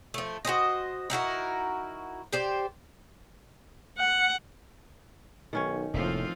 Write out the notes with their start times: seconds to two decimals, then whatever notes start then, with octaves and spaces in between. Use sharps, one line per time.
0.14 F3 A3
0.45 F#4 G4 C5 D#5
1.10 D#4 E4 F#4 A#4
2.33 G4 C5 D5
3.98 F#5
5.53 B1 D#3 C#4 C#5
5.94 F1 A2 F3 A#3 C4 F4